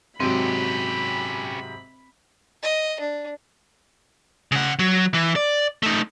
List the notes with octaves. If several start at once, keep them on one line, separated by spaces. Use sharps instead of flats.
G#2 C3 F#3 C4 C#4 G4 B5
D#5
D4
C#3 F#5
F#3
E3
D5
A3 D#4